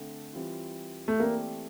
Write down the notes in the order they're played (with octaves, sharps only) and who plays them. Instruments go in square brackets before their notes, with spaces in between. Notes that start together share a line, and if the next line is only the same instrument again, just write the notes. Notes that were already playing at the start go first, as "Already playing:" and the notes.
Already playing: [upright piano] D3 A3 C4
E3 G3 C4 F4
[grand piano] A3
[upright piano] E3 A3 C4 G4 D5 [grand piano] A#3